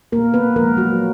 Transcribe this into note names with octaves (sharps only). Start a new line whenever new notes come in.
A#2 A#3 A#4
B3 B4
F3 G#3 A#3 A#4
F#3 F#4